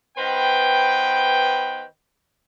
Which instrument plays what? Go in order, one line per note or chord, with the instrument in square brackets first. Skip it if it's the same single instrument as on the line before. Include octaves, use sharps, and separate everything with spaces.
[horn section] D#3 B3 B4 C5 G5